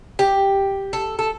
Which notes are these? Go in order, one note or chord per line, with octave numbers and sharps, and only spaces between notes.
G4
A4
A4